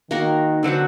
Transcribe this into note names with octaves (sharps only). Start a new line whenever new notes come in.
D#3 A#3 F#4 A#4
D3 F#3 C4 F#4